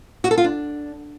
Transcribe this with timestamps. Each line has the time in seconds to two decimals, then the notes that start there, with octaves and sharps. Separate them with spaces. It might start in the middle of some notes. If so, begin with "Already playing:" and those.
0.24 F#4
0.31 A4
0.38 F4
0.44 D4